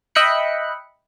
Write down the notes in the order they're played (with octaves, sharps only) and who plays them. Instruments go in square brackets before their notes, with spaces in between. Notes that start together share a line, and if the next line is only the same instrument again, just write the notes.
[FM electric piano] D#5 E5 G5 B5 F#6 C#7